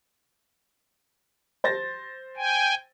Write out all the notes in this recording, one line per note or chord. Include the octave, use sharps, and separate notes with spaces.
C5 A6 A#6
G5 G#5